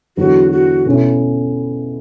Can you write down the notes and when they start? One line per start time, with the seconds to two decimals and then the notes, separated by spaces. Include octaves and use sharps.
0.17 E2 D3 F#3 F#4
0.52 F#4
0.86 B2 A3 C#4 E4